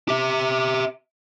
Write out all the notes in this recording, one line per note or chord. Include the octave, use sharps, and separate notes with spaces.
G4 E5